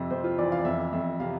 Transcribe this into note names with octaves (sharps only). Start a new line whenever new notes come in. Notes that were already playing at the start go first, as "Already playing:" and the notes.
Already playing: F2 C3 E5
F2 C5
F4
E3 D5
F5
D5
F2 E5
F2 E5
C3 F5